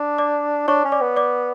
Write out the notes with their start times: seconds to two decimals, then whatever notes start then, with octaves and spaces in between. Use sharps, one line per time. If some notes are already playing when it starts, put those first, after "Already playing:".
Already playing: D4
0.18 D5 D6
0.68 D4 C#5 C#6
0.84 C#4
0.92 D5 D6
1.01 B3
1.16 D5 D6